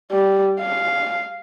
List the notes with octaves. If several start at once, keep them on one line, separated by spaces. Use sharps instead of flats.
G3
F5